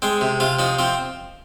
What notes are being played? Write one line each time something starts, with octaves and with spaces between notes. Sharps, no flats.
G#3 C4
C3
C3 F4
F3 D#4
F3 C4